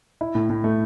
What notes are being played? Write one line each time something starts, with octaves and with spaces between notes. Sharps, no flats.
E4
A2
A2
A3